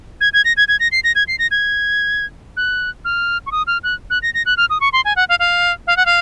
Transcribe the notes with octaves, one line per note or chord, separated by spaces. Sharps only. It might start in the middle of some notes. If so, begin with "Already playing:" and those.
G#6
G#6
A#6
G#6
G#6
A#6
C7
A#6
G#6
C7
A#6
G#6
F#6
F6
C#6
D#6
F6
F#6
F#6
A#6
A#6
F#6
F6
D#6
C#6
C6
G#5
F#5
F5
F5
F5
F#5
F5